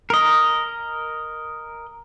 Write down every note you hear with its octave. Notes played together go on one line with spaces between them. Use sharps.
A#4 D#5